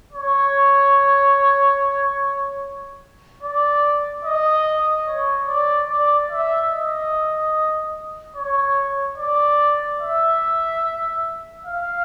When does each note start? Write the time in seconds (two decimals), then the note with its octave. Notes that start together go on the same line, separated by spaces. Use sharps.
0.13 C#5
3.43 D5
4.25 D#5
5.07 C#5
5.47 D5
5.89 D5
6.30 E5
6.71 D#5
8.36 C#5
9.18 D5
10.01 E5
11.65 F5